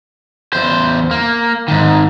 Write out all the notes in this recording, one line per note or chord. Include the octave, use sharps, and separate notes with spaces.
E2 C5
A#3
G#2 D#3